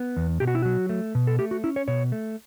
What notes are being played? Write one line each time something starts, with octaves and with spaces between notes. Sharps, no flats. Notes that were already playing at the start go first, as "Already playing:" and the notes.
Already playing: B3
E2
B2 G4
F#4
E4
F#3 F#4
A3
B2
A4
A3 G4
F#4
C#4 E4
C#5
B2 C#5
A3